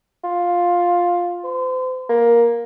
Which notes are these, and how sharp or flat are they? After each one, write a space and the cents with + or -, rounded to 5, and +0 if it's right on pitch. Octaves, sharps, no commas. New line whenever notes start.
F4 +10
C5 -35
A#3 +10